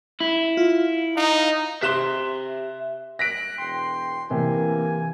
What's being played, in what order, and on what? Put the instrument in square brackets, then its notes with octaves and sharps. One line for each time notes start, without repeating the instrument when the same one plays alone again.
[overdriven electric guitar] E4
[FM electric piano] F4
[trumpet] D#4 [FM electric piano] F5
[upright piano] C3 F#6 E7 [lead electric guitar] E5 C6
[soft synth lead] F#6 [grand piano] A#6 B6 D7
[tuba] E1 [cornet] G5 [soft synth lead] C6
[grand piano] C3 [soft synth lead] E3 [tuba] A#3 [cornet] G#5